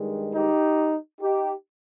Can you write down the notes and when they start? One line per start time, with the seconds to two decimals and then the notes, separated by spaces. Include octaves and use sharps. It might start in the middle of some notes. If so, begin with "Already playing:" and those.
Already playing: G2 D#3 G#3
0.33 D#4 G4
1.21 D#4 G4